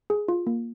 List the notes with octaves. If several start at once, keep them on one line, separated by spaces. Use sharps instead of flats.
G#4
F4
A#3